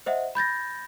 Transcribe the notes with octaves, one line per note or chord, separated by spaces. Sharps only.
C5 D#5 E5 F#5
B5 G6 A6 A#6